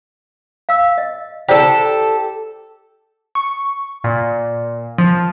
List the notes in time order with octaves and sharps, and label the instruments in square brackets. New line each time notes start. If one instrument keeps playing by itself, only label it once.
[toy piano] F5 E6
D#5
[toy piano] E4 C5 D5 [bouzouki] G4 A4
[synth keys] C#6
A#2
F3